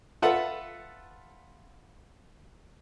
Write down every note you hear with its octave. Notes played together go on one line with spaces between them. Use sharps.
F4 A4 B4 E5 F#5